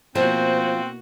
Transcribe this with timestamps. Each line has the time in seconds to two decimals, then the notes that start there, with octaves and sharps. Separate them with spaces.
0.15 B2 F3 A#3 C4 F#4 C5